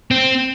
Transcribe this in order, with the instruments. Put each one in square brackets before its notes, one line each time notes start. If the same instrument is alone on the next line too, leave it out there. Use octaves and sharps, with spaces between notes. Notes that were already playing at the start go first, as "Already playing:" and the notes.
[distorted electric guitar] C4